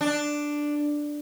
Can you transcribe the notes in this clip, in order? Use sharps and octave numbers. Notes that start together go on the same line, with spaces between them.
D4